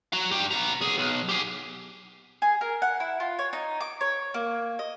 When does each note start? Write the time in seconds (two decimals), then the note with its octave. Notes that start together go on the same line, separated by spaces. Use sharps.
0.13 F#4 A#5
0.31 G2 G4
0.51 B3 A#5
0.81 B1 G#4
0.98 B1
1.29 G4 G#4
2.42 G#4
2.61 A#4
2.82 F#5
3.00 E4
3.20 F4
3.39 C#5
3.53 D#4
3.80 D6
4.01 C#5
4.34 A#3
4.79 D#5